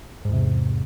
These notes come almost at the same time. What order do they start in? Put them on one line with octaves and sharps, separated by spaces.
G#2 E2 C3